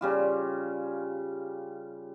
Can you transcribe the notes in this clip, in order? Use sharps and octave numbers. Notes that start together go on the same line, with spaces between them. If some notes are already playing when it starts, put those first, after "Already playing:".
C#3 G3 F4